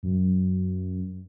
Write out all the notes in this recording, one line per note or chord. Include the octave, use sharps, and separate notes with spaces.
F#2